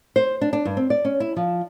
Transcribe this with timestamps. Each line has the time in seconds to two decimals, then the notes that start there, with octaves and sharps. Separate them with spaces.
0.16 C5
0.41 D4
0.53 D4
0.65 G2
0.77 C4
0.90 D5
1.05 C#4
1.20 E4
1.36 F3